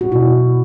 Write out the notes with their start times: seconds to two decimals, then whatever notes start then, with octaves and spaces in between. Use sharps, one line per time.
0.01 F#4
0.12 B2 E4